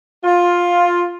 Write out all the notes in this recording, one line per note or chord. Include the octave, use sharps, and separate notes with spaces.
F4